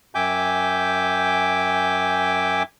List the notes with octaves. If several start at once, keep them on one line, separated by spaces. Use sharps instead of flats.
F#2 E5 G5 G#5 D6 G6